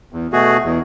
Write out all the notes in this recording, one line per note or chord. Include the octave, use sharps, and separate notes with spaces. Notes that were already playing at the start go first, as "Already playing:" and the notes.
E2
B2 A3 F#4 G#4
E2